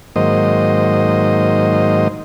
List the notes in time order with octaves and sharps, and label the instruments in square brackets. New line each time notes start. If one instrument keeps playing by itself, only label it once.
[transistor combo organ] G#2 D#3 F#3 A#3 C5 D#5